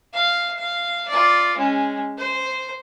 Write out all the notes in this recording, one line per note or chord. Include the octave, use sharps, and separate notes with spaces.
F5
F5
F4 D5
G#3 C#4
C5